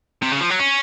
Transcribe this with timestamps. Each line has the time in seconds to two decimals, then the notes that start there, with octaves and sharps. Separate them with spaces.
0.22 C3
0.32 C#3
0.40 F3
0.50 F#3
0.59 C#4